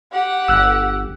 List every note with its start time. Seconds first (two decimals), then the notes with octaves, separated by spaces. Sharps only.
0.12 G4 F#5
0.48 G1 E6 F#6